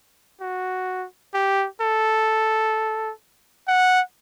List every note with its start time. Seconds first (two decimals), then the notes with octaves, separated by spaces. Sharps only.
0.41 F#4
1.34 G4
1.81 A4
3.68 F#5